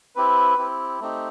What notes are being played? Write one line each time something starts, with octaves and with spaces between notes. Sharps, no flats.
C4 E4 G4 B4
C4 E4 G4
A3 C4 D#4 G4